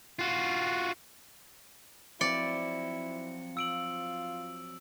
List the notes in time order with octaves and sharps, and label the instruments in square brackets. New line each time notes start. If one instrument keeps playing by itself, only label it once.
[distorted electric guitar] F4 F#4
[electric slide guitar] F3 F#3 C4 [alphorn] E4 [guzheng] D5 [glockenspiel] C#7
[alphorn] F4 [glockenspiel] E6 D7 F#7